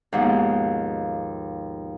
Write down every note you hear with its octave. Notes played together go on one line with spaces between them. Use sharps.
D#2 G#2 B2 F3